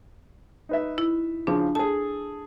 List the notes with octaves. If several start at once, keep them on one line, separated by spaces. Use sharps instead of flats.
D#4 B4 E5
E4
C#3 F3 D4
G#4 A4 A5